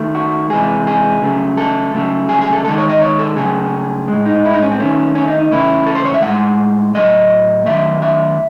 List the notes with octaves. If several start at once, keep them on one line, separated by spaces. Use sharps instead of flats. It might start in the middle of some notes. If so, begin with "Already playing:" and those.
Already playing: D#3 A3
F#4
C3 E3 G#3 G#4
G#4
C#3 F#3 A3
A4
C#3 F#3 A3
G#4
G#4
A4
D#3 G#3 A4
C#5
D#5
C#5
A4
C#3 F#3 A3 G#4
G#3
A2
D#4
E4
D#4
C#4
C4
D#3 A3 C#4
C#4
D#4
D#4
C#3 E3 A3 E4
A4
C5
C#5
E5
A2 F#5
G#3
A2 F#3 A3 D#5
D#3 F#3 A3 E5
E5